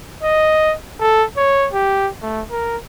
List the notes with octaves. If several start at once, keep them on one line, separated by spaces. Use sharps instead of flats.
D#5
A4
C#5
G4
A3
A#4